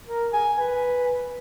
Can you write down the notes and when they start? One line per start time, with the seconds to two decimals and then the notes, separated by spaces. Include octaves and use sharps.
0.07 A#4
0.33 G#5
0.59 B4